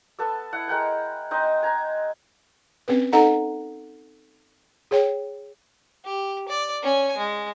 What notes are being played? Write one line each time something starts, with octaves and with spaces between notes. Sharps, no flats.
B3 A4 E6
E4 F#5
G#3 A#4 F#5 G5
C4 D#4 D#5
G#5 A#5
C4 C#4 B4
D#4 A4 D#5 F#5 A#5
G#4 C#5 G5
G4
D5
C#4 G#5
G#3